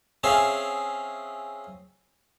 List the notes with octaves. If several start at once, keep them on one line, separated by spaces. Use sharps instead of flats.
C4 C#4 G#4 E5 F5